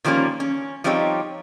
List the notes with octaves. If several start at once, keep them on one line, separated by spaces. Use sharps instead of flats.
D#3 F3 G3 A#3 C#4
C#4
F3 G3 C4 D#4 G4 C#5